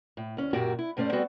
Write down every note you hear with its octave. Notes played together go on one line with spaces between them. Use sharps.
A2
D2 C#4
F#2 A#2 F#4 G4 A#4
E4
G2 A3 C#4 C5 D5
G3 B3 C4 F#4 A4